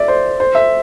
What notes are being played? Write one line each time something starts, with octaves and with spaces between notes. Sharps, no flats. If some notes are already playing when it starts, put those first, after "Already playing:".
Already playing: D5 E5
C5
C5
E5